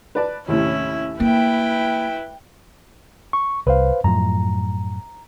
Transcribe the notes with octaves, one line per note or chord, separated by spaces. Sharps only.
B4 D5 A5
D#2 A2 C3 C#4 E4
A#3 E4 B4 G5
C#6
C2 B4 C5 F5
F#2 A2 F3 A#5